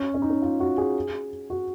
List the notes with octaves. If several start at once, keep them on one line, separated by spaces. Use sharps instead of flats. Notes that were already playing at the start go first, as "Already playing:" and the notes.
Already playing: C#4
C#4
D#4
C#4
F4
F#4
G#4
F#4